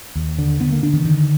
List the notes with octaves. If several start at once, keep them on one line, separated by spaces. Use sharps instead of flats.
D#2
D3
D3 B3
A#3
D3 D4
D#3
D3 D#3